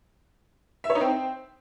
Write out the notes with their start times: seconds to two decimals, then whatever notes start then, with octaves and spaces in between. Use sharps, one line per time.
0.84 E5
0.90 C#5
0.95 D#4
1.01 C4